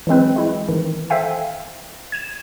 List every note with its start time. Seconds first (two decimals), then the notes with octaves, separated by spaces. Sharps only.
0.07 E3 F#3 G#3 C4 B4
0.36 G#3 E4
0.69 D#3 E3
1.10 A4 C5 E5 F5 G5 G#5
2.12 G#6 D#7 E7